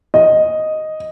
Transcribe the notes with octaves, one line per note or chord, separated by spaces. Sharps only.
D#5